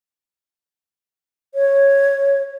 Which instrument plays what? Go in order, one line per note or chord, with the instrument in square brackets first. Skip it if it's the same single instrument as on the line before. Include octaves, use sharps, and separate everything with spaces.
[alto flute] C#5